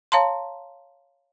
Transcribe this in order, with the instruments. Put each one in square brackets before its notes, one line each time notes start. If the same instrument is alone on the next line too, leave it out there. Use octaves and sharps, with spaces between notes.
[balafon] C#5 F5 A5 A#5 C6